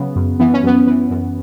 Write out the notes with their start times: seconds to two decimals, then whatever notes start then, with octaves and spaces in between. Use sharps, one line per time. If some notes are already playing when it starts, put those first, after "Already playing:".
Already playing: C#3 F#3 B3
0.16 F#2
0.40 E3 B3
0.54 C#4
0.63 F#2 B3
0.87 E3
1.11 F#2